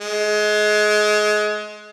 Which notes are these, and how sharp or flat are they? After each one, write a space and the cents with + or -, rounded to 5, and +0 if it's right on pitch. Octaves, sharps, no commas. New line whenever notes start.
G#3 +25